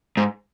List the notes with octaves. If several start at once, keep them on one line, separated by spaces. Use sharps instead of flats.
G#2